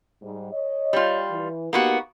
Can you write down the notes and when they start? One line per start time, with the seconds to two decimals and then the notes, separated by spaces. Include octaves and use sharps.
0.22 G#2 G3
0.52 C#5 D#5
0.93 G3 F4
1.31 E3
1.73 A#3 B3 D#4 F#4 G4